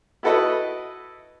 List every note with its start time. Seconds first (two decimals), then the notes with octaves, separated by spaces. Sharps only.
0.23 E4 F#4 A4 B4 D#5